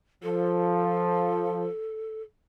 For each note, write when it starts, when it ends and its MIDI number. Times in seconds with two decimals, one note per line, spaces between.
0.23 1.65 53
0.23 2.22 69